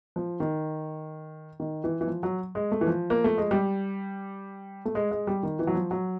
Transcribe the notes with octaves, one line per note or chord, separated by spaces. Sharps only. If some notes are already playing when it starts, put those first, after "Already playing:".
F3
D#3
D#3
E3
E3
F3
F#3
G#3
A3
E3
F3
A#3
A3
G#3
G3
A3
G#3
G#3
G3
D#3
E3
F#3
F3
F#3